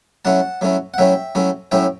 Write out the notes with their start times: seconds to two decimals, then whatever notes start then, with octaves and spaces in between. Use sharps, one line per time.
0.25 F#3 A3 C#4 E4 F#5 A5
0.61 F#3 A3 C#4 E4
0.94 F#5
0.98 F#3 A3 C#4 E4 E5 G5
1.35 F#3 A3 C#4 E4
1.71 A2 F#3 C#4 E4 E5 G5